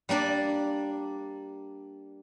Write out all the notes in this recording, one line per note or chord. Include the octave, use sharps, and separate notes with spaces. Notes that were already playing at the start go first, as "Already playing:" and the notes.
G3 A#3 D4 D5